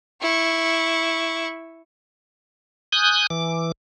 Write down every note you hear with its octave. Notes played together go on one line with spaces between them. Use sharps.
E4 C#6
G#5 D#6 F#6 G6
E3 D6